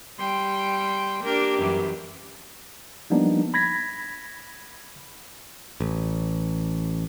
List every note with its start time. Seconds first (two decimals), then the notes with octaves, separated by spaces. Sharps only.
0.19 G3 G5 C6
1.24 A#3 D4 G4 A#4
1.59 F#2 E3 G3
3.10 F3 G3 A#3 B3 D4 D#4
3.54 B5 G#6 A#6 B6
5.80 A1